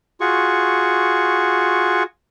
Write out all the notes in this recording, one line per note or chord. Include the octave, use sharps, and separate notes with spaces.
F4 F#4 G#4 C#6